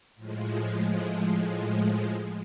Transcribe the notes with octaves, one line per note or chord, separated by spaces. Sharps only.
A2 F3 G#3